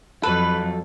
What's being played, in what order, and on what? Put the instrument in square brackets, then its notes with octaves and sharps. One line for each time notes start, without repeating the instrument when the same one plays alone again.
[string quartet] F2 [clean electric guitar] F#3 A4 [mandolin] B4